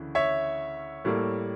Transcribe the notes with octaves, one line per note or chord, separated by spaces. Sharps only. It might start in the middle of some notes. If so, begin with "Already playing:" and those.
Already playing: D2 C#3 E3
C#5 E5
A2 G3 A#3